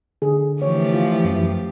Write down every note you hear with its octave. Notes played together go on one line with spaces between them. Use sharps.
D3 G#4
E3 F3 A3 G4 C#5
F4
F#2